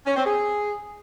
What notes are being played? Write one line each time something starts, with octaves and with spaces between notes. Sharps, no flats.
C#4
C4
G#4